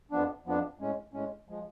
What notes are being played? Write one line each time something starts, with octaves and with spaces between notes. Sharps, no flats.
F2 F3 B3 D4
F2 F3 B3 D4
A2 G#3 C#4
A2 G#3 C#4
F3 G#3